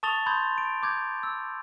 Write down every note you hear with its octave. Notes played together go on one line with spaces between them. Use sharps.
A5 C#6 D#6 A6 F7 G7
B5 C6 D#6 G6 G#6
D7
D6 G6 G#6
E6